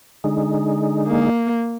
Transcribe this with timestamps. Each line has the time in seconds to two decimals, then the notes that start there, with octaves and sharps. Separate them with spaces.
0.24 D3 G#3 D#4
1.08 A#3